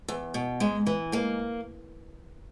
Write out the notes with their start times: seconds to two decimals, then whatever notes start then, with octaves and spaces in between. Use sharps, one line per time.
0.08 E2
0.34 B2
0.60 G#2 G#3
0.86 E3
1.12 G#2 A#3